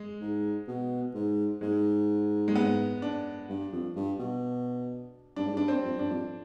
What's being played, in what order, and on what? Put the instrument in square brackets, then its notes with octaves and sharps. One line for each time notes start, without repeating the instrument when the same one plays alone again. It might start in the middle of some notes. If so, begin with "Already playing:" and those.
Already playing: [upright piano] G#3
[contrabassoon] G#2
B2
G#2
[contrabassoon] G#2 [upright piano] G#3
[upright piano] G#3
B3
D4
[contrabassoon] G2
F2
G2
B2
[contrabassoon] G2 [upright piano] D4
[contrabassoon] G#2
[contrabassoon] G2 [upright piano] D4
[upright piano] C4
[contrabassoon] F2
[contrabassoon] G2 [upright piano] D4
[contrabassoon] F2